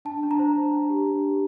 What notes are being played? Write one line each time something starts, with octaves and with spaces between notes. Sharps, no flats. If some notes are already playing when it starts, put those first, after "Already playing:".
D4 A5
D4
A#5
C5
D4
D4
G4
D4
G4